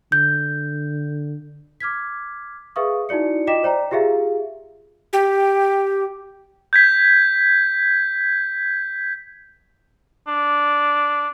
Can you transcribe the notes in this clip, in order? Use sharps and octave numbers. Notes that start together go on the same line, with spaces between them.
D3 G6
D6 F6 G#6 B6
G#4 B4 E5 F5 C#6 D#6
D#4 E4 F#4 D5 C#7
F4 D#5 G5 D6 B6 E7
C5 D5 G5 A#5
F4 G4 G#4 E5 F5
G4
G6 G#6 B6
D4